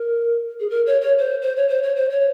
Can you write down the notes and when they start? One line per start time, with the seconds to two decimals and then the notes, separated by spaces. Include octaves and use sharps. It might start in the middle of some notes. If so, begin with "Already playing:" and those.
Already playing: A#4
0.60 G#4
0.69 A#4
0.86 C#5
1.01 C#5
1.18 C5
1.41 C5
1.56 C#5
1.68 C5
1.82 C#5
1.95 C5
2.09 C#5